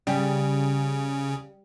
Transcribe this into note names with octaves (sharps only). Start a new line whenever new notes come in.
C#3 G3